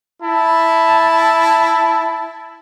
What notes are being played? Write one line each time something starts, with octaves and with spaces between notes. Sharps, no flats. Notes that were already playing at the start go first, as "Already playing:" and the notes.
E4 A5